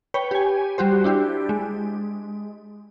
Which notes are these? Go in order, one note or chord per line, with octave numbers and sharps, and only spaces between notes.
B4 C#5 G5
G4 G#5
G3 F#4 G4 C5
D4 E4 G4
G#3